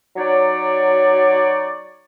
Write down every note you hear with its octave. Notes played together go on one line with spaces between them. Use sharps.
F#3 D#4 C#5 D5